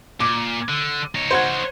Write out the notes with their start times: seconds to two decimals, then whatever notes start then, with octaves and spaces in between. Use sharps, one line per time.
0.20 A#2 D6
0.68 D3
1.15 D#4 C#5
1.31 C5 F#5 G#6